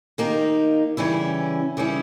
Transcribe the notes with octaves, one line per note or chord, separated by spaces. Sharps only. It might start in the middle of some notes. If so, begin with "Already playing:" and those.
D#3 A#3 D#4 G4
C#3 E3 G3 C#4 E4
C#3 E3 G3 C#4 E4